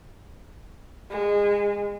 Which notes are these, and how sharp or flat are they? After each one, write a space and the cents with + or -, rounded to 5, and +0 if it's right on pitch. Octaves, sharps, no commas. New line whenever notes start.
G#3 -25